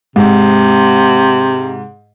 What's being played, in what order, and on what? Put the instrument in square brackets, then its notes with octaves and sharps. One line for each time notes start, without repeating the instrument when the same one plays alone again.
[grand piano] G#2 [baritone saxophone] C3